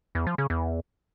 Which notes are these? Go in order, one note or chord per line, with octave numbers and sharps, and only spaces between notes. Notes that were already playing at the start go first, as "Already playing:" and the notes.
E2
F3
C#3
E2